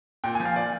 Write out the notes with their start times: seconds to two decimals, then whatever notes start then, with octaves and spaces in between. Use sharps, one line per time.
0.24 A#2 G5
0.35 G#5
0.40 F3
0.45 F5
0.56 A#2 D5